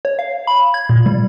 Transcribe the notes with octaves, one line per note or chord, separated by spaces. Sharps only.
C#5
F5
B5
G#6
A#2
G3